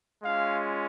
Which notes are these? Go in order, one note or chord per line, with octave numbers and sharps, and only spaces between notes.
G#3 C#4 F4 F5